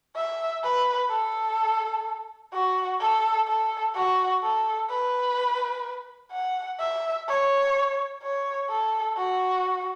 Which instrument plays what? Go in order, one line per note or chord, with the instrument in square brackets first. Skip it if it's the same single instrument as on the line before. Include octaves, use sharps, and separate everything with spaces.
[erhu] E5
B4
A4
F#4
A4
A4
F#4
A4
B4
F#5
E5
C#5
C#5
A4
F#4